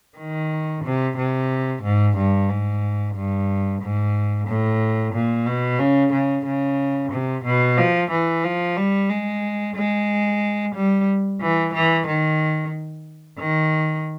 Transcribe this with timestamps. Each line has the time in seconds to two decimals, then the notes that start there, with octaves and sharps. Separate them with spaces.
0.18 D#3
0.84 C3
1.17 C3
1.83 G#2
2.16 G2
2.49 G#2
3.15 G2
3.82 G#2
4.47 A2
5.13 A#2
5.46 B2
5.79 C#3
6.13 C#3
6.46 C#3
7.12 C3
7.45 B2
7.77 F3
8.11 E3
8.44 F3
8.77 G3
9.10 G#3
9.75 G#3
10.75 G3
11.41 E3
11.74 E3
12.07 D#3
13.39 D#3